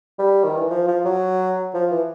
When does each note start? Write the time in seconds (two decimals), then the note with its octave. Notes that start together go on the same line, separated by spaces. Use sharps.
0.19 G3
0.44 D#3
0.57 E3
0.71 F3
0.88 F3
1.05 F#3
1.74 F3
1.91 E3